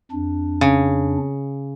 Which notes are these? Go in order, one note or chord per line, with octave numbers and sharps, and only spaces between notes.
F2 D4
C#3